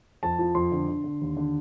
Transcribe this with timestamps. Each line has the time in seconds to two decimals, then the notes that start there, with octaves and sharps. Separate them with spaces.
0.23 F2 A5
0.39 F3
0.55 F2 C6
0.72 D3
0.89 D3
1.04 D3
1.21 D#2
1.37 D3